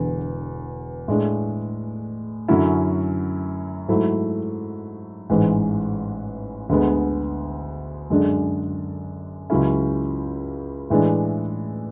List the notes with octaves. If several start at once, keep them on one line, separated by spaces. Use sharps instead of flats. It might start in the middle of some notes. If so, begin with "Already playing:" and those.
Already playing: E1 E2 D3
A2 G#3 D4
F#2 D3 F#3 C#4 E4
G#2 F#3 A3 E4
A1 G#2 E3 G#3
D2 D3 G#3 B3
F#2 D3 G#3 D4
C#2 C#3 F#3 C#4 E4
A2 E3 G#3 D4